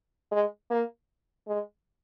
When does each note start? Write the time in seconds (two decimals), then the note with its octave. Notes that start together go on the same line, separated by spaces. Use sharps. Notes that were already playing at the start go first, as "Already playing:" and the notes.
0.32 G#3
0.70 A#3
1.47 G#3